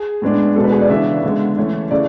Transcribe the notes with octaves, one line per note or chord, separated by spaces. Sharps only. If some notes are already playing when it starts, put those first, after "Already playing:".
Already playing: G#4
A2 G#3 B3 D4
B2 G#3 B3 D4 A4
B4
G#4
D5
C#3 E3 B3 D4 E5
D3 G#3 B3
E3 A3 C#4
C#3 E3 A3 C#4 D5